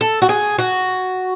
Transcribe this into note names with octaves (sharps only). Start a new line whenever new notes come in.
A4
F#4
G#4
F#4